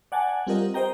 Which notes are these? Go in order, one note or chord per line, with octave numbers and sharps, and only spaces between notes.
D5 F#5 G#5 A5
G3 C4 F4 G4 A#4 D#5
A#4 C5 D#5 G5 A#5